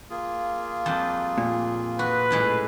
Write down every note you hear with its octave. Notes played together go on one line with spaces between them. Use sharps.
A#3 F4 G#4
F2 G3 A5
A#2
F#4 B4
F#2 A2 G#3